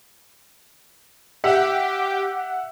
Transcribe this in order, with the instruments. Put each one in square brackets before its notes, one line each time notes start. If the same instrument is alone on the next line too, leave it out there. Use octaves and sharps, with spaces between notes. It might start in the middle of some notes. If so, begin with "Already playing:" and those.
[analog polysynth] G4 [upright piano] E5 [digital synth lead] F#5